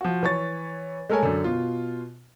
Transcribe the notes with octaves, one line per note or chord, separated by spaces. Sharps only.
F3 F#4
E3 C#5 C#6 A6
G#3 A3 A4 A#4 C#5 G#5
F#2 D3
B2 F4